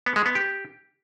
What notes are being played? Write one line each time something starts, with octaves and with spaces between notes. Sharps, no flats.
B3
G#3
B3
G4